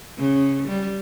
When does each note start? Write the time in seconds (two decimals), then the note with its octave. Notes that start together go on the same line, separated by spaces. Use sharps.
0.18 C#3
0.68 G3